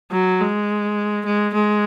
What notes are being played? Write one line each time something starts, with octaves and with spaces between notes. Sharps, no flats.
F#3
G#3
G#3
G#3